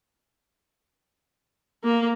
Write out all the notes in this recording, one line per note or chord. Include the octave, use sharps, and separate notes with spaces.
A#3